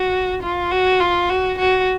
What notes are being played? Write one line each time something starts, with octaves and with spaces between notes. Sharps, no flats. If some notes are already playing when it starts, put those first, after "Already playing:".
Already playing: F#4
F4
F#4
F4
F#4
F#4